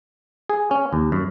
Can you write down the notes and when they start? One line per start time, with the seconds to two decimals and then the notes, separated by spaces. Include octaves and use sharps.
0.49 G#4
0.71 C#4
0.93 D#2
1.12 F#2